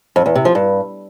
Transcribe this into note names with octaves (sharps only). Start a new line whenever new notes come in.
F2
E2
C3
F3
G2